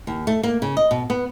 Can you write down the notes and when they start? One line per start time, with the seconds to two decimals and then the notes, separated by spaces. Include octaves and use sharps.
0.07 D#2
0.27 A3
0.43 A#3
0.62 C#3
0.77 D#5
0.91 B2
1.10 B3